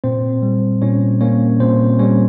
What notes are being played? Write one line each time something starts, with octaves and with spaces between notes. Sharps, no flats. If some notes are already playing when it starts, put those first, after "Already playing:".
A#2 C4 C5
G3
A#2 C#4 C#5
A#3 C#4 C#5
A#2 C4 C5
G3 C#4 C#5